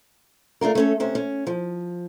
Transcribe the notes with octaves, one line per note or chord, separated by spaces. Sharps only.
A3 D4 F4 A#4
A3 C#4 A4
C3 C#4 C5
C#4
F3